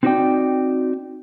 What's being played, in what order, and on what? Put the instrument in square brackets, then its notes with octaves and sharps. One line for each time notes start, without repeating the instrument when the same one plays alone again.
[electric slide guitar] C4 D#4 F#4 B4 D5 G5